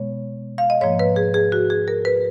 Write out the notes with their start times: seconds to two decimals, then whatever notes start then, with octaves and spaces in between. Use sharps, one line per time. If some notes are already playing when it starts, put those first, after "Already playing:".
Already playing: B2 G#3 B3 C#5
0.58 F5
0.70 D#5
0.81 G#2 F3 A#3 C#5
0.99 B4
1.16 G#4
1.34 G#4
1.52 F#4
1.70 G#4
1.88 A#4
2.05 B4